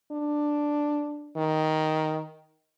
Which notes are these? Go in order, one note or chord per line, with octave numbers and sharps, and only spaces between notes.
D4
D#3